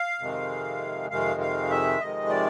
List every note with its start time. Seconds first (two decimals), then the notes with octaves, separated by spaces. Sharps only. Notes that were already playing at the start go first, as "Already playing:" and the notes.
Already playing: F5
0.21 F2 C3 D#3 G#3
1.10 F2 C3 D#3 G#3 F5
1.40 F5
1.70 E5
2.00 F2 C3 D#3 G#3 D#5
2.30 D5